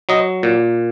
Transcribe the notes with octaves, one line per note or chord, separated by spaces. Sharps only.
F#3 D#5
A#2